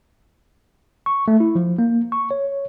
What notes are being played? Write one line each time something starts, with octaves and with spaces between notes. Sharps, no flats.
C#6
A3
E4
F3
A#3
C#6
C#5